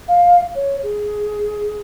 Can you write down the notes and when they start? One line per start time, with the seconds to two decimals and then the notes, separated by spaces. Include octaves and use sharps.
0.08 F5
0.55 C#5
0.83 G#4